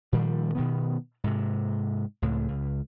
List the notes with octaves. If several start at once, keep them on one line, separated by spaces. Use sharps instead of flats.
A#2 D#3 F3 G3
B2 D#3 B3
G#2 C3
C#2 A2
C#2